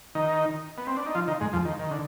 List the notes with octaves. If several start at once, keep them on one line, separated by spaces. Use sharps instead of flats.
D#3 D#4
B3
C4
D4
D#4
F3 F4
D#3 D#4
G#2 G#3
F2 F3
D#3
D#3
D3